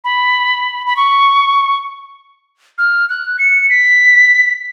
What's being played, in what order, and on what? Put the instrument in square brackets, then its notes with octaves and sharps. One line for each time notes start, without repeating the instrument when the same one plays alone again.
[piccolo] B5
B5
C#6
F6
F#6
C#7
B6